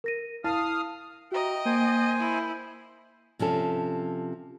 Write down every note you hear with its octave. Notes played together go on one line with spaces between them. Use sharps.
A#4 A#6 D#7
E4 F5 A5 D#6 F6
F#4 D#5 E5 G5 A#5
A#3 C5 G#5
E4
C3 F3 C#4 A4